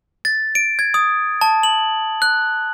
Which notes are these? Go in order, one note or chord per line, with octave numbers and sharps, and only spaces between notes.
A6
D7
G#6
D#6
A5
F#7
F#6